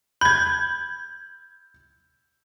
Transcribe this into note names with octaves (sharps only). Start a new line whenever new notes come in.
B5 G6 G#6